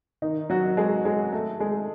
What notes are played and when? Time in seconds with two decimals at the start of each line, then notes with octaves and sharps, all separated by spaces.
0.22 D#3 D#4
0.50 F#3 F#4
0.77 G#3 G#4
1.05 G#3 G#4
1.32 A3 A4
1.60 G#3 G#4